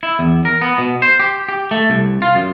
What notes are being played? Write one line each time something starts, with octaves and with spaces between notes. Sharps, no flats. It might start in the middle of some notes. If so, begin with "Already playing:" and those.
E4
E2
A#4
B3
B2
C5
G4
G4
A3
C2
F4
F#2